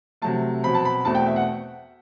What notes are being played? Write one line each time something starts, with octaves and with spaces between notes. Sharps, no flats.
C3 F#3 A3 A5
B2 F#3 C4 B5
A5
B5
E2 B2 A3 C4 A5
G5
E5
F#5